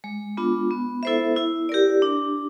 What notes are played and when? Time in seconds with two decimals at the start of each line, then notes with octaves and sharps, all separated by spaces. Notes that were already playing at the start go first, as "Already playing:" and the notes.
0.04 G#3
0.37 B3 D4 F4
0.71 B3
1.03 E4 A4 C5 E5
1.36 E4
1.69 G4 A#4 D5
2.02 D4